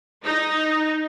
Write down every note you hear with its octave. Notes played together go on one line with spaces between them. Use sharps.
D#4